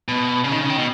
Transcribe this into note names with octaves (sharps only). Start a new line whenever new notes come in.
B2
C#3
D#3
C#3
D#3
B2